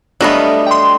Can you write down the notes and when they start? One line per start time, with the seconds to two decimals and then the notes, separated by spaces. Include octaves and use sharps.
0.21 F#3 G3 A3 B3 D4 D#5 F5
0.67 G5 C6